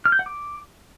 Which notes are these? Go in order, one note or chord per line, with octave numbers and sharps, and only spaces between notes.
F6
G6
F#5
D6